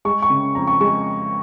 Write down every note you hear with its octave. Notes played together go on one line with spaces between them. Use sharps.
G#3 C#6
C#6
C#3
F2 A#5
C#6
G#3 C#6